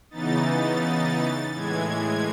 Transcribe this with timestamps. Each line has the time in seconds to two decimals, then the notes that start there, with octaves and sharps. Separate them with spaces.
0.10 C#3 E3 B3 D#4 A6
1.53 A2 E3 G#3 G#6